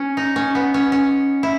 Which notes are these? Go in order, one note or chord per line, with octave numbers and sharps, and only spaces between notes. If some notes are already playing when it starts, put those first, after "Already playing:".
Already playing: C#4
D#4
C#4
B3
C#4
C#4
E4